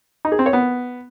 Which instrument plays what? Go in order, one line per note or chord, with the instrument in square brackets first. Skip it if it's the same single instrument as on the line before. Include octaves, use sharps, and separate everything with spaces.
[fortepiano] D#4
G#4
C4
C#5
B3